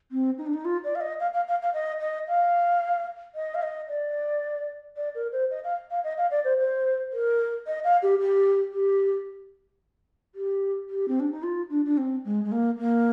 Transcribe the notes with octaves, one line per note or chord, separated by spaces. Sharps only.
C4
D#4
D4
D#4
F4
D5
F5
D#5
F5
F5
F5
F5
D#5
D#5
F5
D#5
F5
D#5
D5
D5
A#4
C5
D#5
F5
F5
D#5
F5
D5
C5
C5
A#4
D#5
F5
G4
G4
G4
G4
G4
C4
D4
D#4
F4
D4
D4
C4
G#3
G#3
A#3
A#3